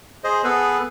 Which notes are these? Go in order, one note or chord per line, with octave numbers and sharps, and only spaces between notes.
G#4 C5 D#5
B3 G#4 A4 B4